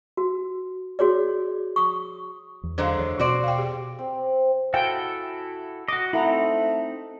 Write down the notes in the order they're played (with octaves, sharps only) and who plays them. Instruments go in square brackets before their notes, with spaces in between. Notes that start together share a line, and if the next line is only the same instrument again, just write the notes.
[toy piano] F#4
F#4 G#4 C#5 D5
C#6 D#6
[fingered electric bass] E2
[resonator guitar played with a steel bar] D3 F#3 G#3 [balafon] C5 F5
[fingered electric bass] E2 [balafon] C#5
[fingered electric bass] B2 [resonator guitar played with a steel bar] F#4 C5 D5
[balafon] F5 G5
G4 G#4
[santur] C4
[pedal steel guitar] E4 F#4 A4 [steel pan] F5 G5 G#5
[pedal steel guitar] F#4 D#5 [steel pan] D6
[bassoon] A3 [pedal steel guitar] C4 D#4 B5 [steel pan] E4 F#5 A#5